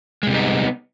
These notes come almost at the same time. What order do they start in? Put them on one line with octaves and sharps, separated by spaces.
G#3 C3 G3 D#4 B3